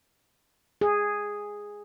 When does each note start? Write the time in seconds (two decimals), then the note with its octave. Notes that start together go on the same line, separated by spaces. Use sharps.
0.81 G#4